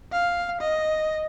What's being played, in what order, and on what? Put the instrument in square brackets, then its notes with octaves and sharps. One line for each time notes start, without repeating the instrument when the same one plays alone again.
[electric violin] F5
D#5